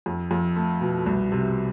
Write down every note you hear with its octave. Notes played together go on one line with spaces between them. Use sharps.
F2
F2
A3
B2
C2
C3